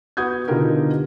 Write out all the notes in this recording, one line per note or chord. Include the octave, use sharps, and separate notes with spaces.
B3 F#4 D#6 G6 G#6
B2 D3 D#4 F4 G4 A#4